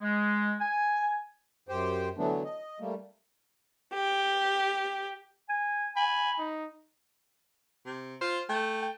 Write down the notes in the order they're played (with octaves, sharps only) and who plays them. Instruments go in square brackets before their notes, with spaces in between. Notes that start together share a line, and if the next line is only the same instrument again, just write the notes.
[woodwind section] G#3
G#5
[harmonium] F#2 G4 C5 G5
D3 E3 F#3 A3 B3 D4
D#5
G3 A3 A#3
[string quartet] G4
[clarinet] G#5
[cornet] G#5 [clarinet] B5
[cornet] D#4
[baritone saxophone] C3
[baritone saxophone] F4 [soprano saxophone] C5
[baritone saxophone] A3 [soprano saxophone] G5
[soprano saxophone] G5